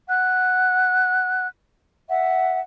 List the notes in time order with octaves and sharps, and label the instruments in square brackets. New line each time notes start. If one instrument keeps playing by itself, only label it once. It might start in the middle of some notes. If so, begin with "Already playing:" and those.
[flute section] F#5 F#6
E5 F#5